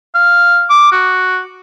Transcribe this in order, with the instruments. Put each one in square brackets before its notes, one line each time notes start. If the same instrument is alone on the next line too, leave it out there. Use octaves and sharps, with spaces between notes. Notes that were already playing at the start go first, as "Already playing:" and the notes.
[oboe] F5
D6
F#4